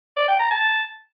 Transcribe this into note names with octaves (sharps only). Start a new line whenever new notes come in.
D5
G5
A#5
A5